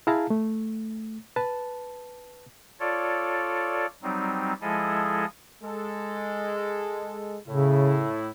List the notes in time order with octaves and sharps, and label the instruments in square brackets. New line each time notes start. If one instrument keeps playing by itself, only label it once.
[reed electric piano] E4 G#4 F5 A5 A#5
A3
B4 A5
[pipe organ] F4 A4 C#5 D5
F#3 G3 C4 D#4
F3 G#3 E4 G#4 A4 D#5
[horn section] G#3 A4
[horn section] A2 E4 [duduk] C#3